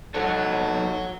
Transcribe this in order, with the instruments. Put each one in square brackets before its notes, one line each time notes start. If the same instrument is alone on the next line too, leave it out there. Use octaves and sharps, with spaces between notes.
[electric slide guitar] D#4 F#4 A4 [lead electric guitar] C#5 F#5